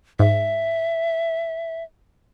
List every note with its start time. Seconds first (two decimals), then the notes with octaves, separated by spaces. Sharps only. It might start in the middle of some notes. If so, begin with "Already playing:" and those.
0.19 G#2 E5